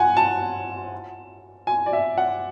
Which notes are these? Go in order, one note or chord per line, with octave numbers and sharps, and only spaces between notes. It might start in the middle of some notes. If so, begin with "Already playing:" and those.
Already playing: F#5 G#5
A5
G#5
D5
E5
F#5